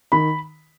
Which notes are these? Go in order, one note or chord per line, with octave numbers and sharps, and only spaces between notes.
D#3 B5